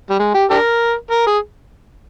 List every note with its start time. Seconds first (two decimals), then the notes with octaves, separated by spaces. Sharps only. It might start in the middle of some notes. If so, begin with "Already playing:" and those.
0.10 G3
0.19 G#3
0.34 G4
0.50 D4 G4 A#4
1.11 A#4
1.27 G#4